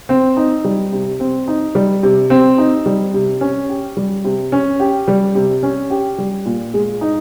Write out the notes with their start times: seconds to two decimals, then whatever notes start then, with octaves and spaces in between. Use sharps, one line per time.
0.09 C4
0.37 D#4
0.64 G3
0.92 C3
1.20 C4
1.48 D#4
1.75 G3
2.03 C3
2.30 C4
2.58 D#4
2.86 G3
3.14 C3
3.41 C#4
3.69 G4
3.97 G3
4.24 C3
4.52 C#4
4.80 G4
5.08 G3
5.35 C3
5.63 C#4
5.90 G4
6.18 G3
6.46 A#2
6.74 G#3
7.01 D#4